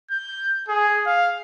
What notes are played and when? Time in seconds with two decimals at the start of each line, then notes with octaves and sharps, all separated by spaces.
0.11 G6
0.69 G#4
1.07 F5